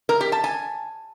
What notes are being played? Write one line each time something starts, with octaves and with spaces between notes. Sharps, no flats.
A#4
G4
A5
G#5